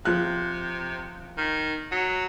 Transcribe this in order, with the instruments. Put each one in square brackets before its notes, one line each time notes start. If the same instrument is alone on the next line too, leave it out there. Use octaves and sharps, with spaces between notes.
[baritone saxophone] C3 [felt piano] F3 F#6
[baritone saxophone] D#3
F#3